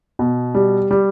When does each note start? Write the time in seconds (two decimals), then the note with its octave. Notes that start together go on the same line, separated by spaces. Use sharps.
0.19 B2
0.55 G3
0.91 G3